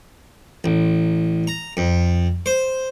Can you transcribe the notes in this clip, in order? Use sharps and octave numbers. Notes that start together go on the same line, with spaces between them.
A1
A#5
F2
C5